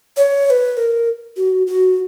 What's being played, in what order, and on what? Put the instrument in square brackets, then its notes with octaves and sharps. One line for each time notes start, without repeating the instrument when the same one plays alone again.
[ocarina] C#5
C#5
B4
A#4
F#4
F#4